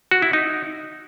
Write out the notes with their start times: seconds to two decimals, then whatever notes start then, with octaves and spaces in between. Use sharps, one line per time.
0.11 F#4
0.22 E4
0.33 D#4